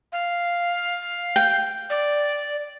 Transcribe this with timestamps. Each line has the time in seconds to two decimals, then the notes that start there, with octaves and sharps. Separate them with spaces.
0.12 F5
1.36 G5
1.90 D5